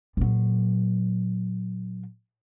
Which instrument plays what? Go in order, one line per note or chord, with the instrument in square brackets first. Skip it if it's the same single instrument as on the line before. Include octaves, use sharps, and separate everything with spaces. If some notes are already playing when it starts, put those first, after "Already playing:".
[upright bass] A#2 F#3